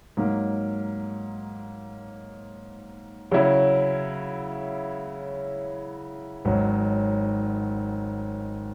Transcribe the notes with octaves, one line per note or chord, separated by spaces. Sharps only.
G#2 F#3 A#3
C#3 F#3 C#4 E4
G#1 G#2 F#3 C#4